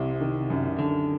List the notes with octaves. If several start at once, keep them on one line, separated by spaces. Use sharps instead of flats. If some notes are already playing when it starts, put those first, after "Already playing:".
Already playing: C2 C3
D#3
F#2
F#2 D3